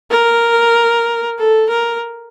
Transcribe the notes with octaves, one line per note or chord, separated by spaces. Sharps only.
A#4
A4
A#4